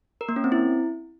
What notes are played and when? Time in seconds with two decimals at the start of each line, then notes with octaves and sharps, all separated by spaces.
0.21 A#4
0.29 A#3
0.36 C#4
0.44 C4
0.52 E4